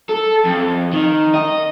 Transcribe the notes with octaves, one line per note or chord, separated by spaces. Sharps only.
A4
F2
D#3
D#5